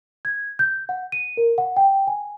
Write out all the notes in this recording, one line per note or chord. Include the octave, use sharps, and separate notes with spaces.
G#6
G6
F#5
D#7
A#4
F#5
G5
G#5